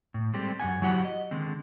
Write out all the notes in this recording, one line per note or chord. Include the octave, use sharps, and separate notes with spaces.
A2
G3 G#3 C4 G4 A4
F#2 A#3 F#5 G#5
F#3 E4 G4 F#5
D#5
D3 D#3 G#3 C4